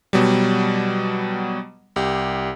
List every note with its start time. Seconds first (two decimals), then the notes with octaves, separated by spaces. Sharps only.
0.13 B2 F#3 G3
1.96 C2 G4